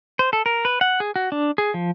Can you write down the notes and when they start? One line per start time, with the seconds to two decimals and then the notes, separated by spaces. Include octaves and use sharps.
0.19 C5
0.33 A4
0.46 A#4
0.65 B4
0.81 F#5
1.00 G#4
1.16 F#4
1.32 D4
1.58 G#4
1.74 F3